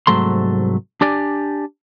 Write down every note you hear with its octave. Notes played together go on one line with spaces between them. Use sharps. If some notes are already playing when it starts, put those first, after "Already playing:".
C2 G#2 F#3 A3 C6
D4 G4 D5 G#5